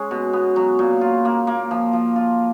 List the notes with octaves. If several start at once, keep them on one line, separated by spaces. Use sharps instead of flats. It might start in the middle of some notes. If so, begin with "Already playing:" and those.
Already playing: G#3 C#4 G#4
B2
B3
F#3
A#2
F4
A#3
A#3
F3
F3
F4